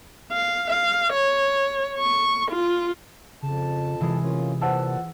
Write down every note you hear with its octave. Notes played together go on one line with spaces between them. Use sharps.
F5
F5
C#5
C#6
F4
F2 C#3 A5
C3 E3 G#3
A#3 C#4 F4
A#2 E3 C5 F#5 A5 E6